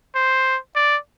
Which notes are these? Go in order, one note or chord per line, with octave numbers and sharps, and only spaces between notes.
C5
D5